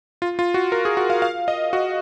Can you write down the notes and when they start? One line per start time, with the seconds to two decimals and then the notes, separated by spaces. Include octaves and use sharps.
0.22 F4
0.39 F4
0.54 F#4
0.72 A#4
0.85 G#4
0.97 F#4
1.10 F5
1.22 F5
1.48 D#5
1.73 F#4